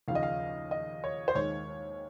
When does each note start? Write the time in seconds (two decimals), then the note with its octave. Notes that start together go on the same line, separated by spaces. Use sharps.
0.08 D#2 C#3 F3 F5
0.15 D#5
0.23 F5
0.71 D#5
1.04 C#5
1.28 C5
1.35 D#2 D#3 G#3 C#5